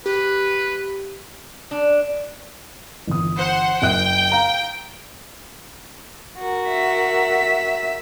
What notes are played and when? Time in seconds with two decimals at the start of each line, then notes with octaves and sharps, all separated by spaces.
0.06 G4 B4
1.71 D4
3.07 G1 E3 D#6
3.36 C5 F#5
3.82 F#1 E5 G5 F#6
4.32 F5 A#5
6.38 F#4 A#4
6.69 E5 B6